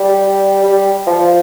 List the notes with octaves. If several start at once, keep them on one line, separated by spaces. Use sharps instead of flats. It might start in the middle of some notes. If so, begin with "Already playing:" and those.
Already playing: G3
G3
F3